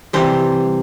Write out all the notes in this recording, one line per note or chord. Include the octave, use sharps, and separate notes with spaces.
C3 E3 G3 C5